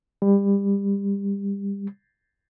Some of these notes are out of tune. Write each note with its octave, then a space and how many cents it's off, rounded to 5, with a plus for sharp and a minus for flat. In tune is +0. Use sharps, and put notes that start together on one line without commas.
G3 +25